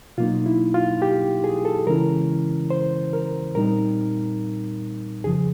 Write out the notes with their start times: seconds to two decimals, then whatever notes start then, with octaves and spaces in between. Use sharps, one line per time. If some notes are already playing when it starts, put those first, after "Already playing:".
0.18 B2 F#3 A#3 D#4 F4
0.46 E4
0.74 F4
1.02 G4
1.44 G#4
1.65 A4
1.87 C#3 E3 G#3 C#4 E4 A#4
2.70 C5
3.13 A#4
3.55 A#2 G3 C4 D#4 A#4
5.24 F2 C#3 F3 G#4